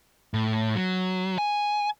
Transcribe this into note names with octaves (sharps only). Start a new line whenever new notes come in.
A2
F#3
G#5